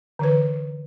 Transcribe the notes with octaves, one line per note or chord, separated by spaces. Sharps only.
D3 E3 B4